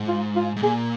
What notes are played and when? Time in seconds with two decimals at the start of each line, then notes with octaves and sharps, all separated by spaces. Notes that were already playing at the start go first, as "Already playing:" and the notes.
Already playing: G#2
0.08 F4
0.36 F4
0.56 G#2
0.63 A#2 G#4